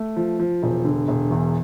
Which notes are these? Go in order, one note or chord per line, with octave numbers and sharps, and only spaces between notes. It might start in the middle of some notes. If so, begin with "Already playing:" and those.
Already playing: A3
F3
F3
E1
D3
E1
E2